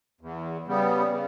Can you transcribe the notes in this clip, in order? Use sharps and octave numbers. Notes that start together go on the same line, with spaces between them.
E2
C#3 G3 B3
C#3